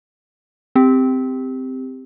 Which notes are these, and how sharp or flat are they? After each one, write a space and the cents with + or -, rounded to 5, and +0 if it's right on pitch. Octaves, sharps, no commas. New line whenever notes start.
C4 -15 G4 +10